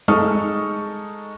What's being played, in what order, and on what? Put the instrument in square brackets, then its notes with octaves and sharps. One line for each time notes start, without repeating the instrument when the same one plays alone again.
[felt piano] G#3 D#4 A4 C#6 D#6 F6